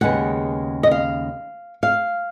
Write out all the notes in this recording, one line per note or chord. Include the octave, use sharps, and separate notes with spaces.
D#2 C#3 G#3 B3 F#5
D#5
F5
F5